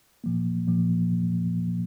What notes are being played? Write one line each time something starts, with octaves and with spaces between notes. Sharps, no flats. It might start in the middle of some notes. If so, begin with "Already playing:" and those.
A#2 F3 A#3
A#2 F3 A#3